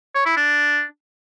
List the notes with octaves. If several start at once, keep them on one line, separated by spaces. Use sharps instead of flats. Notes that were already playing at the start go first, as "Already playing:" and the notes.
C#5
E4
D4